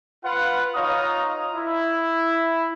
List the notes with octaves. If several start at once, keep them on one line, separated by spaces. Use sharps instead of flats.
F4 B4 F#5
D#4 F4 C#5 F5 A#5 D#6
E4